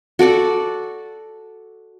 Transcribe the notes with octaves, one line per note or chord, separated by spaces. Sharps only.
F#4 A4 D5 F#5